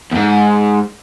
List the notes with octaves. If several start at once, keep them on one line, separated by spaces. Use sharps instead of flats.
E2 G#2